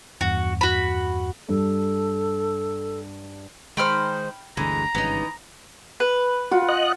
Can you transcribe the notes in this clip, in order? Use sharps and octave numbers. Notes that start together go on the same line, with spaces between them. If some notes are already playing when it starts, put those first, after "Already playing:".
E2 G2 F#4
F#4 B5
G2 A4
D#3 G#3 D#4 C5 G5 B5 F6
G1 D2 D3 E3 G#3 A#5
G#1 G2 C#3 E3 B3 D#4
B4
F4 F#4 F#5
D#5 F#6